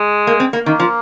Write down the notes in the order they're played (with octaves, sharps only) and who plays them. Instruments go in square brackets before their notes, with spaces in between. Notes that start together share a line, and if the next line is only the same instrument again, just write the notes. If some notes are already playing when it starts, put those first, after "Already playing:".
Already playing: [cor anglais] G#3
[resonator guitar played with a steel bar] A#3
C4
A#3
[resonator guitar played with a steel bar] D#3 [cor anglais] A#3
[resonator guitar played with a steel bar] F3